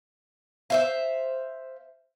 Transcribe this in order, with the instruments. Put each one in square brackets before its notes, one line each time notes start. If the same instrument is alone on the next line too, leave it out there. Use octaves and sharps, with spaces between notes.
[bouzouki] C5 E5 F5